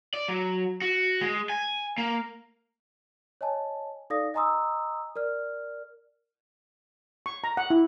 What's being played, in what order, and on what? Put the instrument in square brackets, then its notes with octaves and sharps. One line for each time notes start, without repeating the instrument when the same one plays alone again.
[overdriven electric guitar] D5
F#3
F#4
G#3
G#5
A#3
[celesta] C#5 D#5 G#5 A5
D#4 A4 D5 F5 D#6 A#6
D#5 G#5 A#5 C6 D#6 E6
A#4 D5 F6
[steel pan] C#6
A#5
F#5
E4